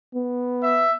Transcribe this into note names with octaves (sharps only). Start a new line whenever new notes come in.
B3
E5